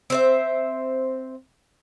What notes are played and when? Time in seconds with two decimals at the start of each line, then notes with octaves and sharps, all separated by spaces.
0.10 C4 C5 E5